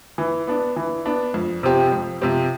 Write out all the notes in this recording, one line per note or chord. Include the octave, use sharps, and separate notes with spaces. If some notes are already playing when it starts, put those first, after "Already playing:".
E3
B3 D4
E3
B3 D4
F2
C3 F3 C4 G4
F2
C3 F3 C4 G4